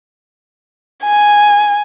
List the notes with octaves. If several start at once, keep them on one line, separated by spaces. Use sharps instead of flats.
G#5